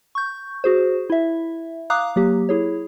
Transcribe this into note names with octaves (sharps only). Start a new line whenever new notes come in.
C#6 G6
F#4 G#4 C5
E4 E5
F5 A#5 D6 D#6 F#6
F#3 A#3 G4
E4 G#4 C#5